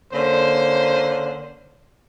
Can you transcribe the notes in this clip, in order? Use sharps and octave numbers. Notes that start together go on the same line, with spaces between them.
D3 A#3 C#4 C5